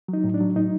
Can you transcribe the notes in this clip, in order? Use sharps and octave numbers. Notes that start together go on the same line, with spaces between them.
F#3 D#4
A2
D4
F#3
A2 D#4